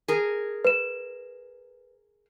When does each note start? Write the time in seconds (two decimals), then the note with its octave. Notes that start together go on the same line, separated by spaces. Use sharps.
0.08 G#4 A#4
0.65 B4 E7